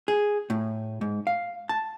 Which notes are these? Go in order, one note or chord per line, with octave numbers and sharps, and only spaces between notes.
G#4
A2
G#2
F5
A5